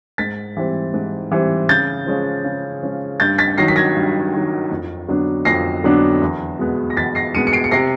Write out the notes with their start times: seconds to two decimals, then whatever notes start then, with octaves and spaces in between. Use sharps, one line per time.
0.18 G#2 A6 B6
0.57 E3 G3 C4
0.94 G#2
1.32 E3 G3 C4
1.69 C#3 G6 A6
2.06 F3 G#3 C#4
2.44 C#3
2.83 F3 G#3 C#4
3.20 G2 G6 A6
3.38 A6 B6
3.58 D#3 F#3 A#6 C7
3.68 B6
3.76 G#6 A#6
3.95 G2
4.33 D#3 F#3
4.71 F2
5.09 D3 F#3 B3 D4
5.45 F2 A#6 C7
5.84 D3 F#3 B3 D4
6.22 E2
6.59 B2 G#3 B3
6.90 A#6
6.96 E2 A6 B6
7.15 A#6 C7
7.34 B2 G#3 B3 C#7 D#7
7.47 C#7
7.53 C7 D7
7.64 C#7
7.71 C3 A#6 C7